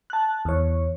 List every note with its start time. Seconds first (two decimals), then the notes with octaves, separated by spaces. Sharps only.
0.10 A5 F#6
0.45 E2 C#5